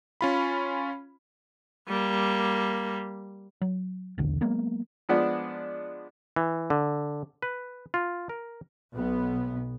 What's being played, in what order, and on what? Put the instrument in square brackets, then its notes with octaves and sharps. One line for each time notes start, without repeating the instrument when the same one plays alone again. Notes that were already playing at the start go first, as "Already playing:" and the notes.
[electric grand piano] C#4 F4 B5
[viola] G3 A#3
[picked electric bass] F#3
D#1 B1 E2 D3
F#3 G#3 A#3 B3
[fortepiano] F3 G#3 B3 D4
[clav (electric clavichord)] E3
D3
B4
F4
A#4
[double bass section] B1 B3